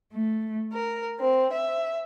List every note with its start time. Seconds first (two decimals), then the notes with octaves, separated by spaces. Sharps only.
0.13 A3
0.72 A#4
1.20 C4
1.52 E5